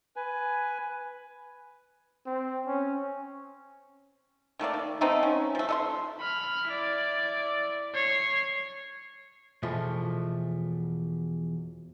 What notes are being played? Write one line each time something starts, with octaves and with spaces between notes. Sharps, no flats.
B4 G#5
C4
C#4
D#3 A3 A#3 D5
D#3
A3 B3 C4 D#4
C#4
F3 A3
A4 D#5 C6
B5 F6
E4 D5
C#5 C7
E2 B2 F3 A3